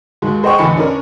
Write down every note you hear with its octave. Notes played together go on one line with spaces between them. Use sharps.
D#2 G#3 F#4
G#4 C5 D#5 F#5 G5 C#6
A1 E2 D3 D#5 B5 C#7
C#4 D4 A#4